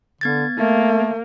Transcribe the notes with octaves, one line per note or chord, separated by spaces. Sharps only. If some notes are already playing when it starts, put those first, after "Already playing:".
D3 B3 G#6 A6
A3 A#3